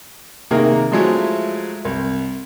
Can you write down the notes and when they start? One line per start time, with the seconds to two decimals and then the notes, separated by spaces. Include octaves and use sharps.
0.51 C3 D#3 A#3 G#4 A#4
0.92 F3 F#3 G#3 A3 E4
1.85 C2